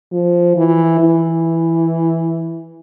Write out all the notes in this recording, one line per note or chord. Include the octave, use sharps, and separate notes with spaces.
F3
E3
E3